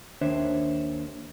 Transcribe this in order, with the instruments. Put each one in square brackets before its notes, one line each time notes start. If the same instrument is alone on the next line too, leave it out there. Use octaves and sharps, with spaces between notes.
[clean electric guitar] D#2 D4 C5 C#5 E5